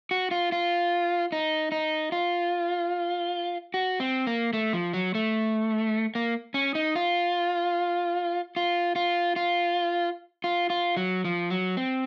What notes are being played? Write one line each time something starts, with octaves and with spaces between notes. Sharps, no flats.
F#4
F4
F4
D#4
D#4
F4
F#4
C4
A#3
A3
F3
F#3
A3
A#3
C#4
D#4
F4
F4
F4
F4
F4
F4
F#3
F3
F#3
C4